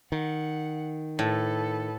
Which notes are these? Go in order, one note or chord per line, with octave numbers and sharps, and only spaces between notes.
D#3 F#5
A2 A4 B4